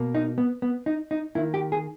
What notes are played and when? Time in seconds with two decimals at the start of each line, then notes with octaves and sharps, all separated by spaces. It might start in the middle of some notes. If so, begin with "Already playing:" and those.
Already playing: B2 A#3
0.15 D#4
0.38 B3
0.62 B3
0.86 D#4
1.11 D#4
1.35 D#3 A#3 E4
1.54 G4
1.72 G#4